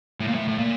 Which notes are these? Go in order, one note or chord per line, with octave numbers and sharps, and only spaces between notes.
A2
A#2
A2
A2
A#2